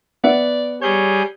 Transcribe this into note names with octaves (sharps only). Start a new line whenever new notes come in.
B3 D5 E5 F#5
G3 G#4 C#5 G6